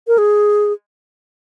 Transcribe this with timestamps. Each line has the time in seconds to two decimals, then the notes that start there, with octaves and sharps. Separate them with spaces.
0.08 A#4
0.18 G#4